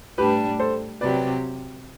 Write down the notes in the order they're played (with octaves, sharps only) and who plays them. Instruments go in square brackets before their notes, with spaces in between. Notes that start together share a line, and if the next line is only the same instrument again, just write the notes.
[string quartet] A2 G3 D4 [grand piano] G4 B4
[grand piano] A4 C5
[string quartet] C3 F#3 C4 G4 [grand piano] B4 D5